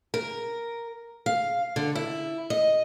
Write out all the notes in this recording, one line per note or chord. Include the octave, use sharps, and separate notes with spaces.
A#4
F5
D3
E4
D#5